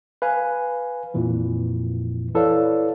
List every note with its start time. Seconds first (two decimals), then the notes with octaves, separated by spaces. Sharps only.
0.22 B4 F5 G#5
1.14 F2 A#2 E3 F3
2.35 E4 A4 B4 C#5 D5 F5